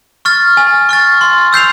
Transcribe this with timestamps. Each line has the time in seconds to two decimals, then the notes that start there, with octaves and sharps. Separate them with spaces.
0.25 C#6 F6 A6
0.57 G#5
0.89 C#6 F6 A6
1.21 C6
1.53 E6 G6 C7 F7